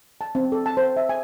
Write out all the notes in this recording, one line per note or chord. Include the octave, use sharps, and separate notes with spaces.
A5
C4
A4
A5
C5
E5
G#5